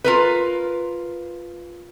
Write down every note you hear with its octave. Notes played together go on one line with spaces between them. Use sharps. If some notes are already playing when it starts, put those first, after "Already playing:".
F4 A#4 B4